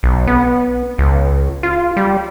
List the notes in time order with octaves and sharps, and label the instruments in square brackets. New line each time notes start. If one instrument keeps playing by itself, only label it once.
[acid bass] B1
B3
C#2
F4
G3